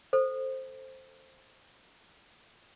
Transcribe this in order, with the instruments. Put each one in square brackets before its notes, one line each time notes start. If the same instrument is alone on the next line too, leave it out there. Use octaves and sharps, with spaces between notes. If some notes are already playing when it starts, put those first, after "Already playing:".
[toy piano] A4 C5